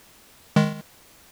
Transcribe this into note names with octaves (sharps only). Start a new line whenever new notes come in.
D#3 G#3